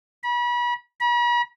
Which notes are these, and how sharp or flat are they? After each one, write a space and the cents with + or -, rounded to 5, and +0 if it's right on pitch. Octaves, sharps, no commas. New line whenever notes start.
B5 -35
B5 -45